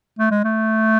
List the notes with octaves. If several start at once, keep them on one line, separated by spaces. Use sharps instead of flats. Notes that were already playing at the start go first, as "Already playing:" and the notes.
A3
G#3
A3